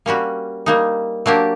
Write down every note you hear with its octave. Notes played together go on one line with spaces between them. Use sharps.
G3 A#3 C#4 F#4
G3 A#3 D#4
F#3 A#3 D4 G4